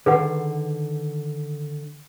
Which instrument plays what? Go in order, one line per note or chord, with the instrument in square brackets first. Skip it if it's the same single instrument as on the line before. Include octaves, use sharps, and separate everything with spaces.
[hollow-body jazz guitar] D3 D#3 [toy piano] G#4 B4 F#5